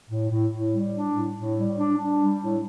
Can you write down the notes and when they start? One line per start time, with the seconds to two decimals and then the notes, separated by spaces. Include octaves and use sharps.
0.09 A2
0.29 A2
0.50 A2
0.72 G3
0.93 D4
1.14 A2
1.36 A2
1.56 G3
1.78 D4
1.98 D4
2.19 G3
2.41 A2